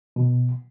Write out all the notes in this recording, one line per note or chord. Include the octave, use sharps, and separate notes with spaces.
B2